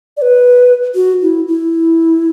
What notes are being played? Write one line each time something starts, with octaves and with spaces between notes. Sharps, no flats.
D5
B4
F#4
E4
E4